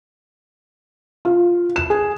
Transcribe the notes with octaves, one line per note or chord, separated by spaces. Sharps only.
F4
E7
G#4